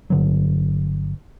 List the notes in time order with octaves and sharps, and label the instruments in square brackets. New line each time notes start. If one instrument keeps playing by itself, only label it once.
[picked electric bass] G1 D3 F#3